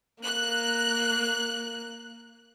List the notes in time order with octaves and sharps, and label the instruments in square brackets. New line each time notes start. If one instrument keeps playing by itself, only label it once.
[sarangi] A#3 [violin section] F#6